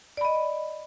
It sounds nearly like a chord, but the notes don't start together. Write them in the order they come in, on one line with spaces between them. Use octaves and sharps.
D5 B5 D#5